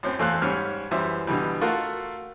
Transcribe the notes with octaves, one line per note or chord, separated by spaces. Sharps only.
F#2 A2 C4
E2 A3 C5 F5 F#6
G#2 G3 C#4 F6
F#2 E3 G3 C5 E5
B2 D3 E3 G3
A3 F4 F#4 A#4 F5